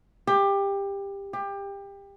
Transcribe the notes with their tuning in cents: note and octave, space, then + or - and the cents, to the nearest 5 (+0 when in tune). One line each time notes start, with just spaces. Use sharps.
G4 +20
G4 +25